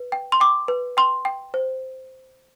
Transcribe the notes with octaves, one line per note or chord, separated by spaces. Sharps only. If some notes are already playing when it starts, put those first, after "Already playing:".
Already playing: B4
G5
C6
G5 D6
B4
G5 C6
G5
C5